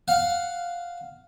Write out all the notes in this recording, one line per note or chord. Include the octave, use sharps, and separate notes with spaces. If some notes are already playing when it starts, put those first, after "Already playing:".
F5 F#5